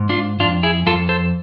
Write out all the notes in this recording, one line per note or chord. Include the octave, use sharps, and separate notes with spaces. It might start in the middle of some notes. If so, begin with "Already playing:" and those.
Already playing: G#2
D4 F4
F2 D4 F4
E4 G#4
F2 F4 A4
A4 C5